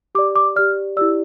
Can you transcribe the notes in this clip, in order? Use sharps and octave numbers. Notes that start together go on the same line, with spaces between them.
G4 D5 D6
D6
G4 D5 F6
E4 G4 D5 E6